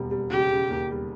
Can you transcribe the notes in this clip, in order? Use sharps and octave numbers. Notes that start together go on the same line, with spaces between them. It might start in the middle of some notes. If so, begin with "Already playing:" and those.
Already playing: E1 D#2 G3
G3
C#3 G4
C#3
D#2
G3